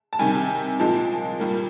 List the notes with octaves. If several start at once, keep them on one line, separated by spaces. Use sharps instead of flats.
A5
C3 D#3 G3 G#5
A#2 F3 G#3 A5
A#2 G3 A#3